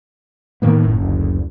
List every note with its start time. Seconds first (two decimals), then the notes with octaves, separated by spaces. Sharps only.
0.62 A2 D#3 A#3 B3
0.83 F#1
1.01 D2